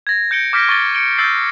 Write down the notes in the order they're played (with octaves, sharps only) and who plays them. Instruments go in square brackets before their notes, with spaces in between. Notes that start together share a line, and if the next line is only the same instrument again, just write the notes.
[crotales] G#6 A#6
G6 C#7 D7 G7
D6 F6 G6 A#6 B6 D7
C#6 A6 G7
C#7 D7 G7
E6 G6 A6 C7 G7